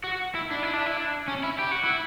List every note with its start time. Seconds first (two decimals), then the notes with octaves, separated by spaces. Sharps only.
0.04 F#4
0.35 E4
0.51 D4
0.63 E4
0.73 D4
0.86 E4
0.97 D4
1.28 C#4
1.44 E4
1.59 G4
1.71 F#4
1.84 E4